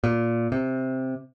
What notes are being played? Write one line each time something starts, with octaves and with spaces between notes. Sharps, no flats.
A#2
C3